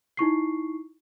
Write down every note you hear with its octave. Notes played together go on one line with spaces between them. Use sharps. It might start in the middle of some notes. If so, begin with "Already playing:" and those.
D#4 E4 C#6 C7